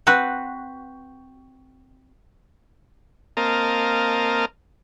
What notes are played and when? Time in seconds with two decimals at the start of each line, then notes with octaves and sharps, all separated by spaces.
0.07 C4 F#4 B4
3.37 A#3 C4 A#4 D#5 F5 A5